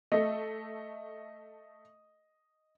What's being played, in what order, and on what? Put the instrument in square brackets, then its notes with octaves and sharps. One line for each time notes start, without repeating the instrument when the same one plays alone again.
[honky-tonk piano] A3 A4 [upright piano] D#5